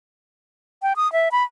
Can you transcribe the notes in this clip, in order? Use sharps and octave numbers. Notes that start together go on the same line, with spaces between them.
G5
D#6
E5
B5